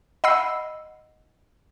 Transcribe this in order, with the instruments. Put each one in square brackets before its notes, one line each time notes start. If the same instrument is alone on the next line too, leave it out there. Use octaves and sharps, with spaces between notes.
[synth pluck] D#5 F#5 B5 E6 C7